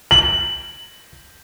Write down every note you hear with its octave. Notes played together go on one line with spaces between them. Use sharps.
F#7